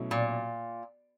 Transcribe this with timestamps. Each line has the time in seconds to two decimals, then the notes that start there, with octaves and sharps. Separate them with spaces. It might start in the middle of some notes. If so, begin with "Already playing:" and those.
Already playing: B2 F#3 A3 C#4 E4
0.11 A#2